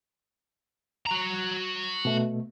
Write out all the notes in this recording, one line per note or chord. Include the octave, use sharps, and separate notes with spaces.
F#4 A#5
B2 A3